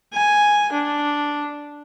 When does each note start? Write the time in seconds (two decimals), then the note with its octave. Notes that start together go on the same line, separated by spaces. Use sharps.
0.13 G#5
0.72 D4